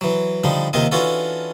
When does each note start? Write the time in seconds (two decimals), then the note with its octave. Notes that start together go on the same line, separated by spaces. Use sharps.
0.01 E3 F#3
0.44 D3 F3 G3 D4 D#4
0.73 D#2 C3 D#3 C4 F4 D#5
0.92 E3 C#4 D4 F4 F#4 A4